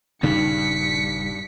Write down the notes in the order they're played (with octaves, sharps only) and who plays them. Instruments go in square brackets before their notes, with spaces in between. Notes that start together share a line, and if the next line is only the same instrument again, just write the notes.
[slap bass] D#1 C#3 B3 [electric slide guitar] G2 [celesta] D#4 [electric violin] B6 C#7